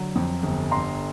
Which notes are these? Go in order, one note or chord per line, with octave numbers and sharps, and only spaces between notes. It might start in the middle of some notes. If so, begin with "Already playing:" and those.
Already playing: D3 F#3
F2
G1
D3 A#5 C6